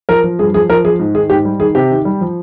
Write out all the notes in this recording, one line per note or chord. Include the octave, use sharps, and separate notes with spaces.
F3 A#4
F3
G2 G#4
F3 G#4
F3 A#4
F3 G#4
G#2
D#3 G#4
G#2 G4
G3
D#3 G#4
C3 G4
D#3
G3
F3